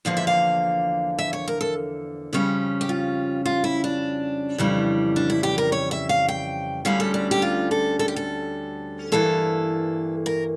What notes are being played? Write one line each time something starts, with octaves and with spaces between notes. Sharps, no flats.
E2 D3 F3 A#3 F5
E5
F5
E5
C#5
A#4
A4
F2 C#3 G3 C#4
G4
F4
F4
E4
D4
F2 C#3 E3 G3
D4
E4
G4
A#4
C#5
E5
F5
G5
D2 D3 G3 C#4 F5
A4
D4
G4
F4
A4
A4
G4
A4
G2 E3 A#3 A4
A#4